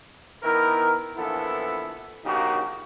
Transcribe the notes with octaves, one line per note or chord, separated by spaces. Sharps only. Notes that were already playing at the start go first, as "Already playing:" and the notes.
D#3 B3 E4 A#4
A#1 E3 B3 E4 A4
A#1 C#3 A#3 D#4 F#4 G4